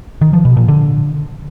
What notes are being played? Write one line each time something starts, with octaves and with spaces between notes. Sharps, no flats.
D#3
F3
B2
A#2
D3